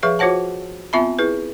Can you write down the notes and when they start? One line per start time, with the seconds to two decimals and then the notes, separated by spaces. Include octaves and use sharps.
0.03 F3 G#4 B4 E5 F5
0.19 F4 F#4 C5 C#5 F#5 A5
0.93 B3 C4 F4 E5 A5 B5
1.19 E4 G#4 B4